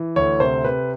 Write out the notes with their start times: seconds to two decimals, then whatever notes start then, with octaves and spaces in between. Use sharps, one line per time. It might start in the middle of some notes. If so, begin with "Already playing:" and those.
Already playing: E3
0.16 D2 C#5
0.40 C3 C5
0.64 C3 B4